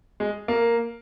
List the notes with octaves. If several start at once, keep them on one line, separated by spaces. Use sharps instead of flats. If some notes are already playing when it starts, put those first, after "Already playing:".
G#3
A#3